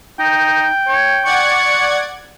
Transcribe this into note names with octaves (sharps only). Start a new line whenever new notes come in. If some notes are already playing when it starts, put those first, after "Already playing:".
D#4 G5
C#5
D5 F#5 C#6 G#6